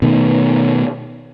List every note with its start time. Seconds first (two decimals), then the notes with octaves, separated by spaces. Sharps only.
0.02 B2 D#3 A3